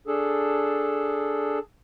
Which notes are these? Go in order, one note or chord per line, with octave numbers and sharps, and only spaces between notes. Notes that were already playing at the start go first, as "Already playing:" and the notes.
D4 G#4 A4